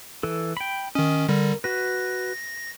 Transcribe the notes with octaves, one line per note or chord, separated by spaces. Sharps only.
E3 A4
G5 B5
D#3 C#4 D#5
D3 G3 A#4
F#4 B4 A#6